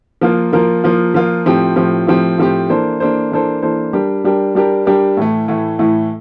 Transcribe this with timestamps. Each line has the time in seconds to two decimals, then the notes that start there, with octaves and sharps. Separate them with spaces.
0.21 F3 A#3 F4 A#4
0.53 F3 A#3 F4 A#4
0.84 F3 A#3 F4 A#4
1.14 F3 A#3 F4 A#4
1.45 A2 F3 C4 G4
1.76 A2 F3 C4 G4
2.07 A2 F3 C4 G4
2.38 A2 F3 C4 G4
2.69 E3 A#3 D4 A4 C5
3.00 E3 A#3 D4 A4 C5
3.31 E3 A#3 D4 A4 C5
3.62 E3 A#3 D4 A4 C5
3.93 G3 D4 G4 A#4
4.24 G3 D4 G4 A#4
4.55 G3 D4 G4 A#4
4.86 G3 D4 G4 A#4
5.17 A2 E3 A3
5.48 A2 E3 A3
5.79 A2 E3 A3